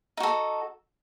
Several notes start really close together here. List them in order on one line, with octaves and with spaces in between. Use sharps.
D#4 F#4 A4